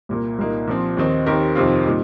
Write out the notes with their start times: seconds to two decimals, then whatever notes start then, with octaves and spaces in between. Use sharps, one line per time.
0.09 C2 A#2 A#3
0.38 C2 A#2 A#3 D#4
0.67 A#2 F3 C4
0.97 D#2 D#3 C4 D#4
1.26 D#2 D#3 C4 G4 A#4
1.55 F2 C3 D#3 C4 F4
1.85 A#2 G3 D#4